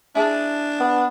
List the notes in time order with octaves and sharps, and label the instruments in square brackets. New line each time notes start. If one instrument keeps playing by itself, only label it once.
[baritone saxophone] D4 [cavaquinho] E4 G#4 A5
[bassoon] B3